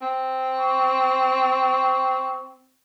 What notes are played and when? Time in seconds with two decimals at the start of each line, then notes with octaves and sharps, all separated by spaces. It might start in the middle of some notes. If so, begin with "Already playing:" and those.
0.02 C4
0.58 C#6